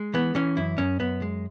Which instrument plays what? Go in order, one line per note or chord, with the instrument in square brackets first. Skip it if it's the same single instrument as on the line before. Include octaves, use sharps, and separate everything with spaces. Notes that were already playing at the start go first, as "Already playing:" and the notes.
Already playing: [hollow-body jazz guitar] G#3
E3 B3
E3 C#4
F#2 E4
F#2 C#4
F#2 B3
G#3